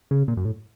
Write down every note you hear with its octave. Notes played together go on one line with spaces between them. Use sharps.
C#3
A#2
F#2
A2